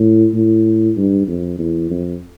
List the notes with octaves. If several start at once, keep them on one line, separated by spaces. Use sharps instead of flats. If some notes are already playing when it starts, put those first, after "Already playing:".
Already playing: A2
A2
G2
F2
E2
F2